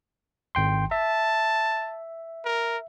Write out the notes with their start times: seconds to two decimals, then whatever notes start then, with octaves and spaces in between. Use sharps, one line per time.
0.55 G#1 G5 C6
0.91 E5 A5
2.45 A#4